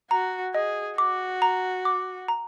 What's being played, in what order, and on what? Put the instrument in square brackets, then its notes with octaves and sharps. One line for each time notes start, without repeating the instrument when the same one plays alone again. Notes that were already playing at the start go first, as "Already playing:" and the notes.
[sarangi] F#4 [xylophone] A#5
[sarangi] G#4 [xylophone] D#5
[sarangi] F#4 [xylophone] D6
[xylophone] A#5
D6
A#5